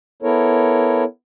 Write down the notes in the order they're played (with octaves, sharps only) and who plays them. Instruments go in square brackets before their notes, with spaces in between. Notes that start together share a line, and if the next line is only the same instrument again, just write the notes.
[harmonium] B3 E4 A4 A#4 C#5